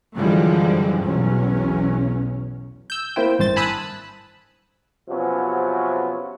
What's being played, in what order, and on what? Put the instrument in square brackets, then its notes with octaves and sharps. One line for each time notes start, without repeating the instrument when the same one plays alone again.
[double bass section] F#2 D3 E3 F3 G3 G#3
B1 E2 C#4
[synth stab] E6 G6
A#3 C4 E4 C5 G5
G#1 G2 C5 A6
G#5 A5 B5 D#6 E6 F#6
[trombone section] C3 F3 F#3 B3 C#4